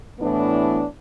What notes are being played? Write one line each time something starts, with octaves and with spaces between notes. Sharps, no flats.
A2 E3 B3 D4